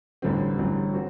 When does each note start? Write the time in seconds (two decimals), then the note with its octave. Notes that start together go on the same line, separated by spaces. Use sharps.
0.22 A1 G2 D3 F#3 C4
0.58 A1 G2 D3 F#3 C4
0.94 C4 F#4